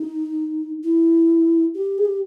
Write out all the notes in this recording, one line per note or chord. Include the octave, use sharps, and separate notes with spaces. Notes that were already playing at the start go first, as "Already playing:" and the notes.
Already playing: D#4
E4
G4
G#4
G4